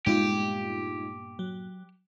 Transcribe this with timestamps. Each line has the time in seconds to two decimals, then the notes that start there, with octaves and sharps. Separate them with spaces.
0.06 G2 A#2 G#3 B3 D#4 F4 G4
1.39 F#3